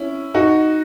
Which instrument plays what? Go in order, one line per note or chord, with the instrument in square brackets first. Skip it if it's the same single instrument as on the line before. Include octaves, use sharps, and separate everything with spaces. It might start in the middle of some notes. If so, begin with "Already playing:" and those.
Already playing: [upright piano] C#4 E4
D#4 F#4